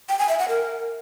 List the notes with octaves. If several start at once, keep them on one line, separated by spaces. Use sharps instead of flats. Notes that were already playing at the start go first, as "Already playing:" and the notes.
G5
G#5
E5
F#5
A#4